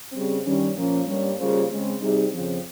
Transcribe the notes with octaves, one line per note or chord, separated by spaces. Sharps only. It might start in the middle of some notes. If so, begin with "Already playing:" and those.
C#3 G3 C4
G2 D#3 G3 C#4
A#2 F3 A#3 C#4
G2 G3 A#3 C#4
C#3 G3 A#3 F4 C5
C#3 G#3 C4
C3 G3 C4 D#4 G#4
F2 C#3 F3 C4